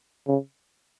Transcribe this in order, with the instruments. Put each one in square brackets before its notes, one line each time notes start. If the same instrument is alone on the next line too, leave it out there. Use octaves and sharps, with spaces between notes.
[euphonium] C#3